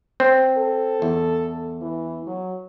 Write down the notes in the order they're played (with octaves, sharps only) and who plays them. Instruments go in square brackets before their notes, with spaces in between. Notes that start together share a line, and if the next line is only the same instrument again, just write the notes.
[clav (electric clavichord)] C4
[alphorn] A4
[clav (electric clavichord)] E2
[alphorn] E3
F#3